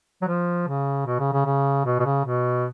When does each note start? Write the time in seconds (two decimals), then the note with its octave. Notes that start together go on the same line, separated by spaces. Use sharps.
0.22 F#3
0.28 F3
0.68 C#3
1.07 B2
1.19 C#3
1.33 C#3
1.46 C#3
1.85 B2
2.00 B2
2.05 C#3
2.25 B2